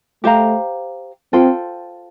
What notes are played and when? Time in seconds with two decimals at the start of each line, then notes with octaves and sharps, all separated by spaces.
0.24 A3 G4 C5 F5 A#5
1.33 C4 F4 A4 C5 G5